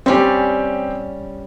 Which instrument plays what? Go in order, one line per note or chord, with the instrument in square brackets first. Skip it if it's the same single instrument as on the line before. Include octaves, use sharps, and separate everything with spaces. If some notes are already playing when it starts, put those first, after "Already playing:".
[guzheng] G3 C#4 [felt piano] C4 G4